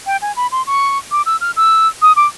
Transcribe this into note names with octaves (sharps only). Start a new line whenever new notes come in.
G5
G#5
B5
C6
C#6
D6
E6
F6
E6
D#6
D6